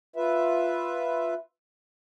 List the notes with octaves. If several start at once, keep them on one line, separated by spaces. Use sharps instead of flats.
F4 B4 E5